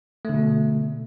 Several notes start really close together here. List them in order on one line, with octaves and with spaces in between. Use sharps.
A3 D3 B2